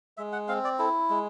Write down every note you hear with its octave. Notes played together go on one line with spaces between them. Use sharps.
G#3 E5
F#5
C4 F5
D5
E4 A4
G#3